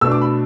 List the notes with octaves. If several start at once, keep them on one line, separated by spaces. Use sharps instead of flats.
B2 A3 D4 E6
D6
B5